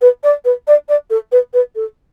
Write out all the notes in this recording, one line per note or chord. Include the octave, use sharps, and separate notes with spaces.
B4
D5
B4
D5
D5
A4
B4
B4
A4